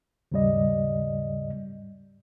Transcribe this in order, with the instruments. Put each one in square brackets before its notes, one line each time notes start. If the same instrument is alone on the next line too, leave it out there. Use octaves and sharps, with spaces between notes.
[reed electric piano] D#2 G#2 C#3 G3 D5 D#5